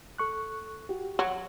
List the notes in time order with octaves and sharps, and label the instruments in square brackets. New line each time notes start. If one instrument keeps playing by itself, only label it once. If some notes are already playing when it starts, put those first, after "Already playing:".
[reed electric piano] A4 C#6 F#6
F#4 G4
[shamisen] F#3